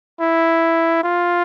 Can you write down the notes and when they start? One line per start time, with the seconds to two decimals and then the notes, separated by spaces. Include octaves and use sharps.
0.20 E4
1.04 F4